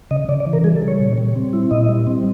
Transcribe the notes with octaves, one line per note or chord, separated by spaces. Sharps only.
C#3 D#5
C#3 D5
D5
E3
A#4
G3 G#4
A4
C#3
C#5
A#2
G3
C4
E4
A#2 D#5
G3
C4